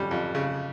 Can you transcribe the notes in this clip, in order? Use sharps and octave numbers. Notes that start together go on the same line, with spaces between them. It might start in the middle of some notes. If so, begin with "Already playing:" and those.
Already playing: F2 G3 C#4
F2
C#3